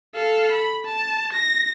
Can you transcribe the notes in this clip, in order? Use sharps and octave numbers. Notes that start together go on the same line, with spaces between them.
A4 F5
B5
A5
A#6